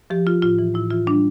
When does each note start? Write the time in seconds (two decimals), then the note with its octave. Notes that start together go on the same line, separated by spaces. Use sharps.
0.10 F3 G4
0.27 F3 F4
0.42 A2 F4
0.59 E3
0.74 A2 E4
0.90 E3 F4
1.07 G3 D4